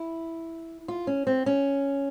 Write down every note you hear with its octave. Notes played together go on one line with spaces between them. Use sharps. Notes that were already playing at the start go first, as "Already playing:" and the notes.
Already playing: E4
F4
C#4
C4
C#4